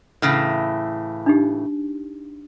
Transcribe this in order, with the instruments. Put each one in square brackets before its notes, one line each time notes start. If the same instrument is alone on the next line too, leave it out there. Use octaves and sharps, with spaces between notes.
[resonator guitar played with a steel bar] A2 C#3 E3
[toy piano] D4 D#4 G4